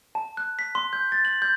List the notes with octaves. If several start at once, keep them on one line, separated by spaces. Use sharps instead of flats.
A5
F#6
B6
C6
G6
A6
F#7
G6